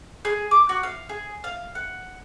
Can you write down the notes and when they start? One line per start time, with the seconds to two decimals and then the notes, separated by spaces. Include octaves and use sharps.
0.25 G#4
0.51 D6
0.69 F#4
0.83 F5
1.09 G#4
1.44 F5
1.75 F#5